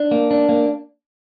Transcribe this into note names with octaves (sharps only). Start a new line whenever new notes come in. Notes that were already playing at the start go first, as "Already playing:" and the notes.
Already playing: D4
A#3
D4
A#3